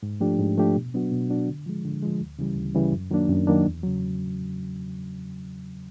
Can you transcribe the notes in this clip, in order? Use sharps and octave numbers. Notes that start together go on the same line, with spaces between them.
G#2
F3 A3 D4 G4
G#2
F3 A3 D4 G4
B2
F#3 B3 D4 F#4
B2
F#3 B3 D4 F#4
D3
F3 G#3
D3
F3 G#3
D2
C#3 E3 G3
D2
C#3 E3 G3
F#2
D#3 F#3 A#3 D4
F#2
D#3 F#3 A#3 D4
E2
C#3 F#3